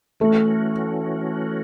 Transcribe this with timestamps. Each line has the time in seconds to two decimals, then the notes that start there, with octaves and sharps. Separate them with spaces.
0.20 E3 A3 C#4 F#4